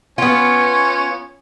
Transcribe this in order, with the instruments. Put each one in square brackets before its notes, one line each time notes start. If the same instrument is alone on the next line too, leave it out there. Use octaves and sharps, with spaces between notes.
[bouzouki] B3 F4 [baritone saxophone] C#4